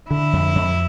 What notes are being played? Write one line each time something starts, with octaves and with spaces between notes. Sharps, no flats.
D3 E4
F2
F2